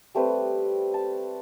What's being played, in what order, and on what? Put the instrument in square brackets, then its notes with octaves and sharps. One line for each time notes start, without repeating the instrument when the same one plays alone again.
[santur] G3 A3 C4 B4
A5